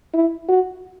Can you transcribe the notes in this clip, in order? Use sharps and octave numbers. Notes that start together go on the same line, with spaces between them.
E4
F#4